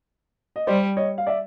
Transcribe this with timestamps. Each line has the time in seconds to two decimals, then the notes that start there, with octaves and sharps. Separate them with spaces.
0.56 D#5
0.67 G3 C5 D5
0.97 C#5 D#5
1.18 F5
1.27 D5 E5